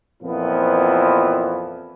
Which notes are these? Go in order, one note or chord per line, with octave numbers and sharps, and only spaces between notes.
F2 A#2 E3 F3 B3